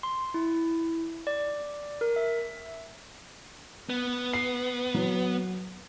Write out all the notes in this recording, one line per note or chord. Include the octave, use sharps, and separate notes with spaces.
C6
E4
D5
A#4
E5
B3
C7
F#3